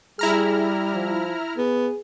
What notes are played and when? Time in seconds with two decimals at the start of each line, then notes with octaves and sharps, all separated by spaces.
0.19 G3 E4 G#4 A#5 F6
0.94 F3
1.58 B3 G#4